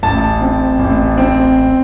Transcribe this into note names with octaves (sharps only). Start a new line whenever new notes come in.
A1 A5
C4
A1
C4